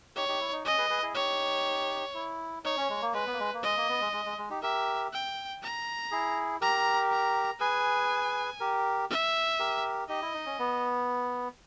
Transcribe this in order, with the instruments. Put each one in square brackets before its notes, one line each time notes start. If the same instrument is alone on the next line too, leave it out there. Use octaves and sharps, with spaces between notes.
[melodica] D#4 G4 [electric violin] C#5
[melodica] D#4 G4
E4
D#4
[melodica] C#4 [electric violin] D#5
[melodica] G#4 B4
G#4 B4
E4 G#4
[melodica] D#4 G4 [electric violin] C#5
[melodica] E4
[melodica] D#4 [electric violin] C#5
[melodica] C#4
G#3
A#3
[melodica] G#3 [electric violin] B4
[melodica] B3
A#3
G#3
A#3
[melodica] G#3 [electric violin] D#5
[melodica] A#3
B3
G#3
G#3
G#3
G#3
D#4 G4
[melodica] G4 A#4 [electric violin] E5
[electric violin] G5
A#5
[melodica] E4 G#4
[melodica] G4 A#4 [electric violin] A#5
[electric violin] A#5
[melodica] G#4 B4 [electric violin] G#5
[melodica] G4 A#4
[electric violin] E5
[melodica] G4 A#4
[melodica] D#4 G4 [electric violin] D#5
[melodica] E4
D#4
C#4
B3